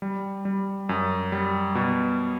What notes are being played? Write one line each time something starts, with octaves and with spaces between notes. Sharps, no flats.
G3
G3
F#2
G3
B2